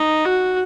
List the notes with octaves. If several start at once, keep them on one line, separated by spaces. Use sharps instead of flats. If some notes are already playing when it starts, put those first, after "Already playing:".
Already playing: D#4
F#4